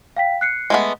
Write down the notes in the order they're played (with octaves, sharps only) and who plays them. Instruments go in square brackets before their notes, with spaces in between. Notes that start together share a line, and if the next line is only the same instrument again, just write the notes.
[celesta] F5 G5 B6
F#6 C7 C#7
[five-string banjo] G#3 A3 B3